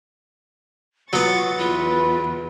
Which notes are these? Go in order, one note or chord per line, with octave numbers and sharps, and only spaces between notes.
F#3 B3 F4 C#6 A6
E2 F4 B4